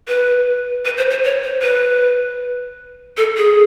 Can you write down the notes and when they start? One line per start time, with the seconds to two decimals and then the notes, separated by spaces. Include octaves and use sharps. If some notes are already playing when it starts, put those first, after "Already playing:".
0.08 B4
0.85 B4
0.97 C5
1.10 C5
1.24 C#5
1.43 C5
1.62 B4
3.17 A4
3.37 G#4